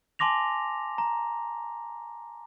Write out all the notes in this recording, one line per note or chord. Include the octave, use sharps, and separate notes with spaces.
G#5 A5 C6 D6 A#6 F7
A#5